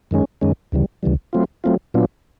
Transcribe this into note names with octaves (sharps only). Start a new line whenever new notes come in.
F#2 D#3 G#3 C#4
F#2 D#3 G#3 C#4
D2 C#3 E3 G3
D2 C#3 E3 G3
F#3 A3 C4 F4
F#3 A3 C4 F4
A#2 F#3 B3 D4 F4